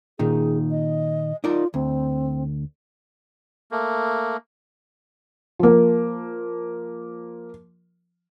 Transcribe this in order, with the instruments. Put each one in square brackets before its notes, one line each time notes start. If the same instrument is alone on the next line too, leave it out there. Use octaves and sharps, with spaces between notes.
[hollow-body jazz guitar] A#2 D#3 D#4 [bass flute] G#4
[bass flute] D#5
[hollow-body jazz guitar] D#4 A#4 D5 [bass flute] F4
[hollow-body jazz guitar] D2 [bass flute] C4
[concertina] A3 A#3
[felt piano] F3 A#3